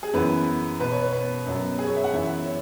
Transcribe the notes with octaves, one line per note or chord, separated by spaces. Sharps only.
G#4
F#2 E3 B3 B4
B2 B3 B4
C#5
B4
B4
F#2 F#3 B3
G#4
C#5
E5
F#5
F#2 E3 B3 E5
C#5